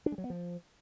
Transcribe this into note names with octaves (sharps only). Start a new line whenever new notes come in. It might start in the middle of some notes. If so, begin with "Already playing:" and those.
D4
G#3
F#3
B3
F3